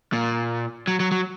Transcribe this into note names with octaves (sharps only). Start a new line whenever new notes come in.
A#2
F#3
F#3
F#3